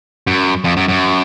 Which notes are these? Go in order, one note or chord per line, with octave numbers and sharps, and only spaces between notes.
F#2
F2
F#2
F#2